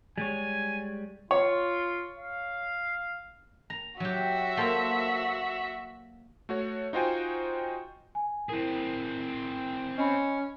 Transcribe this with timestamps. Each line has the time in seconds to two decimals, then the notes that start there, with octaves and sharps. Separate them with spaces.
0.18 G3 G#3 C#5 G#5
1.31 F4 C#5
2.19 F5
3.70 A#5
4.00 F#3 F#4 G4 E5
4.57 A#3 A4 C5
6.49 A3 F#4 C#5
6.93 D#4 F4 F#4 C5 G5 G#5
8.15 G#5
8.49 C4 E4 G#4 A#4
9.98 C#4 D#5 B5